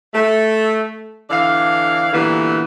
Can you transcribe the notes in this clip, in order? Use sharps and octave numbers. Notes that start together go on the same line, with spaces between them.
A3
D3 E3 D5 F5
A#2 D3 E3 G3 B3